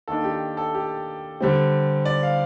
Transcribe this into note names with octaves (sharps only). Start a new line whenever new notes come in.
D#3 A#3 D4 A4
G4
A4
G4
D3 G3 C4
D5
F5